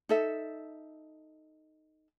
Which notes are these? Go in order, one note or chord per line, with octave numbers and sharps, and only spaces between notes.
D#4 A4 E5